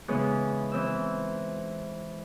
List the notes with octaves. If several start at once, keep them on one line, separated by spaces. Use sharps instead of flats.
C#3 E3 G#3 B3 C#4 D#4
E3 C4 E6